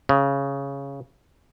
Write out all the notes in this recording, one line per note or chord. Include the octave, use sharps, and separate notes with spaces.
C#3